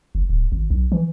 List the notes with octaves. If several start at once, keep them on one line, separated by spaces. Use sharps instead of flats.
F#1
D1
G#1
B1
E3